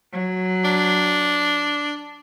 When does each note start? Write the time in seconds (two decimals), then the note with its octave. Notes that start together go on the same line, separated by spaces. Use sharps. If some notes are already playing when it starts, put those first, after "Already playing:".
0.13 F#3
0.64 D4